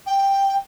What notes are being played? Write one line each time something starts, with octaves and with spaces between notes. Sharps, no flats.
G5